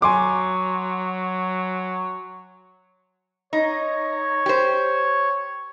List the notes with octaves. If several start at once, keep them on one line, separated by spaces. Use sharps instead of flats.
F#3 G#5 C6 D6
D#4 C#5
G4 C5